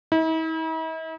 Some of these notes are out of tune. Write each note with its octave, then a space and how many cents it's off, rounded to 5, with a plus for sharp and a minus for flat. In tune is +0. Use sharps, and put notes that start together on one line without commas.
E4 -45